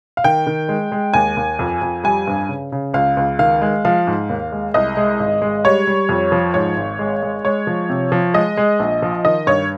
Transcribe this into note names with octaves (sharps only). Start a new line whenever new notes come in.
F5
D#3 G5
D#3
G#3
G#3
D#2 G#5
D#2
F2
F2
G3 G#5
G2
C#3
C#3
C#2 F5
C#2
D#3 F5
G#3
F3 F5
G#2
D#2
G#3
C2 D#5
G#3
G#1
G#3
G3 C#5
G3
F2
F3
G#2 C#5
G#1
G#3
G#3
G#3 C#5
F3
C3
F3
G#3 D#5
G#3
A#1
F3
D#3 D#5
G2 C#5